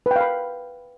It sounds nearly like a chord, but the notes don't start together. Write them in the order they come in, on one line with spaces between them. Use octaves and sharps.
B4 G5 F5 B5